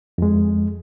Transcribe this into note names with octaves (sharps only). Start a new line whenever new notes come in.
F2 G#3